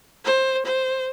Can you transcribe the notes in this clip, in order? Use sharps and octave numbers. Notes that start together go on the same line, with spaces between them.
C5
C5